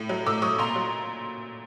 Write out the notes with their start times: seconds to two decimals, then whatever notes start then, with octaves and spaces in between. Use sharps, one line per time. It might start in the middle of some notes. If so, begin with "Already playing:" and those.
Already playing: A2
0.09 F#3
0.26 A2 D6 E6
0.42 F#3 C#6 D#6
0.58 A#2 A#5 C6
0.76 F#3